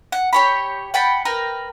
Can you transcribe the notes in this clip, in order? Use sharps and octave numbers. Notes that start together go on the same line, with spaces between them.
F#5
G4 C#5 B5
F#5 G5 A5 B5
A#4 B4 G5